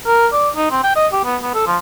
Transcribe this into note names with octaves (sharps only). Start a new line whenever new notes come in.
A#4
D5
D#4
C4
G5
D#5
G4
B3
B3
A4
F3